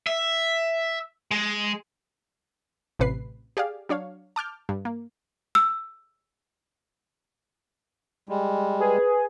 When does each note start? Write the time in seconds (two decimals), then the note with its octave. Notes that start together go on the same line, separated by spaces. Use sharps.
0.07 E5
1.31 G#3
2.99 A1 C3 B4 C7
3.57 G4 G#4 D5 F5
3.89 F#3 D4 C#5 F5
4.36 A5 D6 F6 G6
4.69 G2
4.85 A#3
5.55 E6
8.29 G3 G#3
8.80 G#4 B4